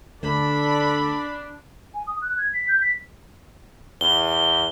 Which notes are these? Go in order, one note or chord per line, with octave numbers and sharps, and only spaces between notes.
D2 D4 A4 B5
G#5
D#6
F#6
G#6
B6
G6
B6
E2 G7